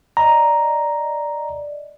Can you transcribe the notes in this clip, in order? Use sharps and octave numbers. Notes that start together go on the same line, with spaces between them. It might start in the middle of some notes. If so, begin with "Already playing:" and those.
D5 D#5 A#5